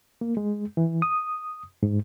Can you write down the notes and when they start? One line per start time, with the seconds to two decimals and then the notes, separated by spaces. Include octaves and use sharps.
0.21 A#3
0.37 G#3
0.77 E3
1.02 D#6
1.83 G#2